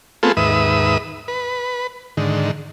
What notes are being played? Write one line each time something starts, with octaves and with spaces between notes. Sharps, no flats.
A3 B3 C4 F4 G#4 A4
D#2 G#2 B4 E5 D#6
B4
G#2 D3 D#3